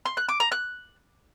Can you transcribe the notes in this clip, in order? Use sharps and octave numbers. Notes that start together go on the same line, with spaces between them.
C6
F#6
D6
A#5
F#6